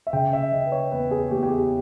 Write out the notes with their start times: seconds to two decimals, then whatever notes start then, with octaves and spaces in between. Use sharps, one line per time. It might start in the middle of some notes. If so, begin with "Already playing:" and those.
0.07 E5
0.13 C#3 G5
0.33 E5
0.52 C#3 D#5
0.66 B4
0.72 C#5
0.92 E2 B4
1.11 G#4
1.31 E2 G4
1.43 G4
1.50 G#4